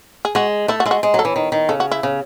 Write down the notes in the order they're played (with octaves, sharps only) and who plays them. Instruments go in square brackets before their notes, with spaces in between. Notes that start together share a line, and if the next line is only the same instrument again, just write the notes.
[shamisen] G#4
[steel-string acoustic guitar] G#3 [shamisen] F#4
[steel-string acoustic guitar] A3 [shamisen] E4
[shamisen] F#4
[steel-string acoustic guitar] G#3 [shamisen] E4
[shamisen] F#4
[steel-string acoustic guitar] G#3
F#3
[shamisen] A4
[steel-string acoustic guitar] E3
D#3
D#3
[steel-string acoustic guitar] C#3 [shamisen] A4
[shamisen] F#4
E4
[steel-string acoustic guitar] C#3